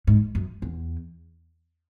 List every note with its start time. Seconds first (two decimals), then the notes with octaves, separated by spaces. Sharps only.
0.07 G#2
0.35 F#2
0.62 E2